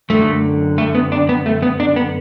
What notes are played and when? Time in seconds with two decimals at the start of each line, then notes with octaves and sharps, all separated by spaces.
0.10 F#2 D3 A3
0.78 A3
0.95 B3
1.12 D4
1.29 B3
1.46 A3
1.63 B3
1.80 D4
1.96 B3